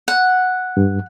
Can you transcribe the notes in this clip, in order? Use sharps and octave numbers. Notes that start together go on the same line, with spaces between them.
F#5
G2